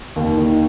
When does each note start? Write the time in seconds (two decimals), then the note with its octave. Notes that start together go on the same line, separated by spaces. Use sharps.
0.16 D#2
0.37 D#3